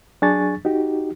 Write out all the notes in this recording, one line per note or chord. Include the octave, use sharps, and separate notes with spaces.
F#3 D4 G#4 G#5 C#6 A6
D#4 F#4 G4